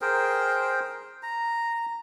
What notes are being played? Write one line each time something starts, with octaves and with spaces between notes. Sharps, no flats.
G#4 A#4 C5 G5
A#5